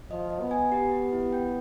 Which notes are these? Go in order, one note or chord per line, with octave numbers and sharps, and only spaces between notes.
F3 D#5
D#5
B3
G#5
G4
G4
E4
G5